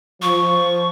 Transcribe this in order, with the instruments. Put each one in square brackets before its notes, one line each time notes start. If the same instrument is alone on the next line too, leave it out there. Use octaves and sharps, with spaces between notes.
[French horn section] F3 [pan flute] C#6